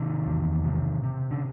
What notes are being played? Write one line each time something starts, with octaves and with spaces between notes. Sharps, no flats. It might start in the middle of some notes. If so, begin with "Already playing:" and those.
Already playing: C3 D#3
E2
C3
C3
D3